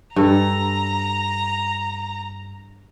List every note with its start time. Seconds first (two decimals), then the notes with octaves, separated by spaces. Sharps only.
0.16 G2 A4 A#5